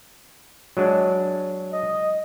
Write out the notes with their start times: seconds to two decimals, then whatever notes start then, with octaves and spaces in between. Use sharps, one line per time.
0.77 F#3 G#3 D4
1.73 D#5